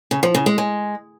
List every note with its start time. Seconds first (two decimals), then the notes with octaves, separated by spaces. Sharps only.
0.11 C#3
0.23 F3
0.34 C#3
0.46 G#3
0.58 G#3